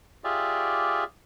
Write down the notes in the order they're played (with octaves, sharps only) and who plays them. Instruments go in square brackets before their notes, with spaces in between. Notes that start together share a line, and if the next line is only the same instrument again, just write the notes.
[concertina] F4 G4 G#4 D5 E5